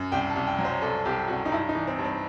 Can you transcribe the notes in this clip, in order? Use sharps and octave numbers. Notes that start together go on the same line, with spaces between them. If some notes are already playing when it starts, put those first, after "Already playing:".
Already playing: F#2
C2 G5
A5
C2
G5
F#3
C5
C2 A4
C2 G4
C2 F#4
D#4
G2 E4
D#4
E3
C4
G2
C4